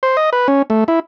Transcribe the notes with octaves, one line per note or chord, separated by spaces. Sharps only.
C5
D#5
B4
C#4
A3
E4